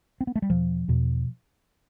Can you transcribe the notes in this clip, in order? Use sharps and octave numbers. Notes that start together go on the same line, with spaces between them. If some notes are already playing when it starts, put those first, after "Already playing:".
C4
B3
A3
G3
E2 B2 F3
E2 B2